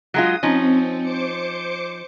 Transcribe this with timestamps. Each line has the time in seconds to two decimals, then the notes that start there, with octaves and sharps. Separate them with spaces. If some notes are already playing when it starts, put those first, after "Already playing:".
0.14 F#3 G#3 F4 D#6
0.43 F3 C4 C#4 D#4
1.01 C5 D6 C#7